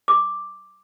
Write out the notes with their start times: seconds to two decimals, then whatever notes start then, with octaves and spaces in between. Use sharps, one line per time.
0.08 D6